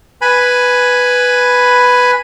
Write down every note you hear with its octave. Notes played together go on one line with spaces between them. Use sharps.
B4 G#5 B5